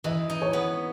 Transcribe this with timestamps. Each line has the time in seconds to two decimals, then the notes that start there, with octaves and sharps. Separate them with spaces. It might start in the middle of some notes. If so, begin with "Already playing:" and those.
0.04 E3 D#5
0.30 D#4
0.42 C#5
0.53 B3